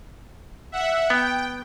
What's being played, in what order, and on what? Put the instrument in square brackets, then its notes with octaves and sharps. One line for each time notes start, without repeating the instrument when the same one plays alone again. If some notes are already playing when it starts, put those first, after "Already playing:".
[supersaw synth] E5 F#5
[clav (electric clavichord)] B3 [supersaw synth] G5